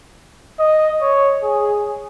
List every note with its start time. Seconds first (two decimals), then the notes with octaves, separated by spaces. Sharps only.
0.59 D#5
1.02 C#5
1.43 G#4